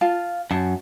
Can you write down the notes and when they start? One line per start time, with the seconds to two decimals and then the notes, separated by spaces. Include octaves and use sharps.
0.01 F4 F5 A5
0.51 F#2 A5